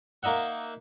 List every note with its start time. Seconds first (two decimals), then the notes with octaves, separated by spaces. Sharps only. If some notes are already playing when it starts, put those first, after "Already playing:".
0.23 A#3 D#4 D#5 E5 F#5